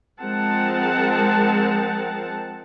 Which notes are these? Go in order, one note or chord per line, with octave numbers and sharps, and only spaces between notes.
F3 G#3 C4 A#4 F#5 A5